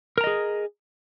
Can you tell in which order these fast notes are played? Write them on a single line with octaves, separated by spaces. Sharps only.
A#4 A#5 D#5 G#4